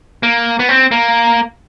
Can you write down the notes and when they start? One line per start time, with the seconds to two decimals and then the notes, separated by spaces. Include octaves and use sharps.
0.23 A#3
0.59 B3
0.69 C4
0.91 A#3